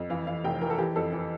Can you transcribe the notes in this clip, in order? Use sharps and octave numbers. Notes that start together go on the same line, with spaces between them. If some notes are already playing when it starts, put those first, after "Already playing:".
Already playing: F2
E3 F5
E3 F5
F1 G5
E3 A#4
A4
E3 G4
F2 A4
E3